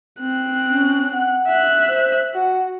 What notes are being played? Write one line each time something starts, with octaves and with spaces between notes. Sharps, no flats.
C4 F#6
C#4
F#5
E5 F#6
C5
F#4 F#5